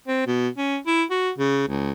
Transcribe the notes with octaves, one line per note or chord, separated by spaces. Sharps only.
C4
B2
C#4
E4
F#4
C#3
C#2